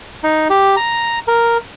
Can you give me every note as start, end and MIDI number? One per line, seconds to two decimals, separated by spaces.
0.23 0.48 63
0.50 0.75 67
0.76 1.19 82
1.28 1.57 70